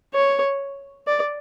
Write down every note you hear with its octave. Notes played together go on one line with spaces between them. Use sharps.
C#5
D5